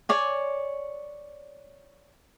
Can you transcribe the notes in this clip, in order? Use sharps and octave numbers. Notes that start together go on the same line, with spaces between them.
C#5 D5 G#5